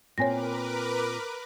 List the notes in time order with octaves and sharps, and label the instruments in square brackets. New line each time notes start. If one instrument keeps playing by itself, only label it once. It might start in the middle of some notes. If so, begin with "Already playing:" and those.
[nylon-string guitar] A#2 C4 [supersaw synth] A#4 B4 D6 [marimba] C#5 G#5 A#6